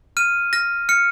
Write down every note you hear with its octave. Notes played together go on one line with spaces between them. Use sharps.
F6 D#7
F6 A#6
F6 C#7